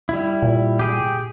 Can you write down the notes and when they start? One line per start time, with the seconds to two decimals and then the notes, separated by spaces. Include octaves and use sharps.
0.09 G3 E4
0.42 A#2
0.79 G4 G#4 G5